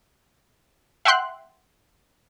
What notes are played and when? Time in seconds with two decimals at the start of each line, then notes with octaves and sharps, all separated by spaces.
1.05 E5 F#5 G5 C6 F#6